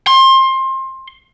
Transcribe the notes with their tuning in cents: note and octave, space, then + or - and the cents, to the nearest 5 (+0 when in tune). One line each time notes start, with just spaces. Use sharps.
C6 +25